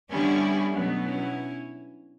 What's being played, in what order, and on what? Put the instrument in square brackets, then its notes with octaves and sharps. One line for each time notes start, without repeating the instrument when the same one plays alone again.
[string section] D3 G3 C#4 E4 [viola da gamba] B3 D4
[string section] B2 F#3 B3 [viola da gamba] A3 C#4
[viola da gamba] C#4 E4